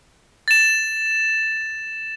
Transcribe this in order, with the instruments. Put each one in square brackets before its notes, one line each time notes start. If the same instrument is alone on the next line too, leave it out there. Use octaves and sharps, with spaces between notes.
[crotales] A6 E7